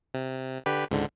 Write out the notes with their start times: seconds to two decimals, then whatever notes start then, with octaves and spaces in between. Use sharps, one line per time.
0.14 C3
0.66 D3 G4 B4
0.91 C#2 G#2 D3